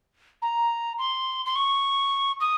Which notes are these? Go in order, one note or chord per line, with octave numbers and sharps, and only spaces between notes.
A#5
C6
C6
C#6
D#6